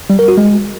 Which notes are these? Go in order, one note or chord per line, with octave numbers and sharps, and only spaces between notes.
G3
A#4
F#4
G#3